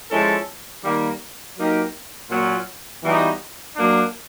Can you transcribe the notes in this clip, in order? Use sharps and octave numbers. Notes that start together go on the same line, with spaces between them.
F3 G#3 C#4 E4 A4
D#3 G3 A#3
F#3 A#3 D#4 G4 A#4
A#2 F#3 A#3 C#4 F4
E3 G3 B3 D#4 F#4
F#3 A#3 D4